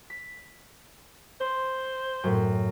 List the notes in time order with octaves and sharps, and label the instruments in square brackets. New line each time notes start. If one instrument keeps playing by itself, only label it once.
[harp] B6
[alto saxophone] C5 [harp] C6
[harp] F#2 A2